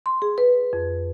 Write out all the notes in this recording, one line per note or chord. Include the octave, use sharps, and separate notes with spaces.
C6
G#4
B4
F2